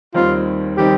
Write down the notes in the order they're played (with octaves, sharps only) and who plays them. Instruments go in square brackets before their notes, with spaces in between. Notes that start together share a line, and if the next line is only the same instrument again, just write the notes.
[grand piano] D#2 D#3 G3 C4 D#4 [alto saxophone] F4
[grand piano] D#3 G3 C4 D#4 [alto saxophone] G4